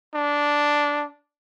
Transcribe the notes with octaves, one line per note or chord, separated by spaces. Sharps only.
D4